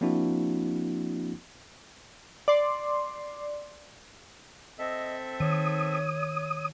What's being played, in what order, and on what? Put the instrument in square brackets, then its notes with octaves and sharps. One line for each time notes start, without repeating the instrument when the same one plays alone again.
[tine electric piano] F3 A#3 C4 D4 E4 F#4
[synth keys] D5 C6
[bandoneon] C4 A4 E5 [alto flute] D#5
[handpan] D#3 [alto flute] C#5 [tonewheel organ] D#6